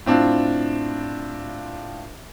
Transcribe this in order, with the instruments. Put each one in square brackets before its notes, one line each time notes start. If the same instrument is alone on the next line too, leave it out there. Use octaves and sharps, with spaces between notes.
[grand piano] A2 C4 D4 F4